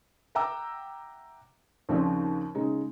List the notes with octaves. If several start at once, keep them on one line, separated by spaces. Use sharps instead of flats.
E5 F#5 G5 A#5 D6 E6
D#2 C#3 F3 C4 D4
C#3 G#3 D#4